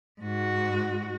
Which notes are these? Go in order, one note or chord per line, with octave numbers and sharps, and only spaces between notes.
G#2 F#4